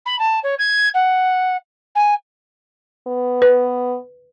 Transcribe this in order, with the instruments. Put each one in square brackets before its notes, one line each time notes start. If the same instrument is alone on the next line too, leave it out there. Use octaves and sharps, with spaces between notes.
[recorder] B5
A5
C#5
G#6
F#5
G#5
[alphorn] B3
[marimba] B4